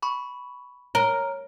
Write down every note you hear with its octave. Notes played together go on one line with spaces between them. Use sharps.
B5 C#6
A#4 C#5